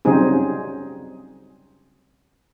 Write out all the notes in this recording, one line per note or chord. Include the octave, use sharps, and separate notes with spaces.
C#3 F#3 G3 C4 D#4 G#4